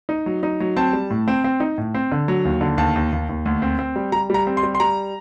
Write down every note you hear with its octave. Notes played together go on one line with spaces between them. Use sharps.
D#4
F#3
D#4
F#3
C4 A5
G3
A2
C4
C4
D#4
A2
C4
D3
F#3
D#2
D3
D#2 A5
D#2
D#2
D#2
D2
C4
C4
G3
G3 A#5
G3 A#5
C4
C6
G3
C6
G3 A#5